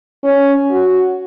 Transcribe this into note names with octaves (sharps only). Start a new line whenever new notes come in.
C#4
F#4